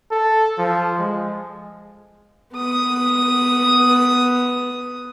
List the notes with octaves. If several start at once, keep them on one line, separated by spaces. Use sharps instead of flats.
A4
F3
G#3
B3 D#6